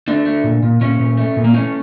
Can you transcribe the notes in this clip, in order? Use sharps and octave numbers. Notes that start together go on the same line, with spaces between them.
A3 D4
A3
A#2
A#2
A#2 C#4
A#2
A3
A#2
A#3
A3 C#4